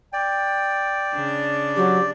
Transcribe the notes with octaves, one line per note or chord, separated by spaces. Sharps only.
D5 G5
C#3 D4
F#3 G4